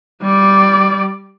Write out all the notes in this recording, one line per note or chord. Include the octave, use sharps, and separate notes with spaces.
G3 D5